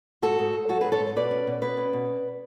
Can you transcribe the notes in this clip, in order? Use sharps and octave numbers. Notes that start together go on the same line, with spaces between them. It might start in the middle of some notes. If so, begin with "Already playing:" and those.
G#2 F#4 A4
G#2
G#2
F#3 F#4 A4
G#4 B4
G#2
A4 C#5
G#2
B2 B4 D5
C#4
B2
B2 B4 D5
C#4
B2